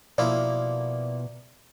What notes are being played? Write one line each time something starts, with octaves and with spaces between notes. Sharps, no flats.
B2 F3 A#3 E4 D5